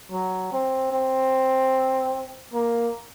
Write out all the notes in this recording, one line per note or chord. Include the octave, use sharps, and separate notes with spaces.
F#3
C4
C4
A#3